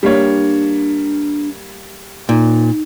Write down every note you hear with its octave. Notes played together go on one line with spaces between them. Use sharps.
G3 A#3 D4 C#5
A#2 D#4